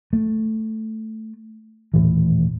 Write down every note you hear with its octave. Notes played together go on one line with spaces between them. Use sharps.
A3
D#1 A2 E3